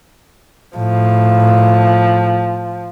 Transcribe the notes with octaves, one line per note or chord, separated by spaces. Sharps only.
A2 F3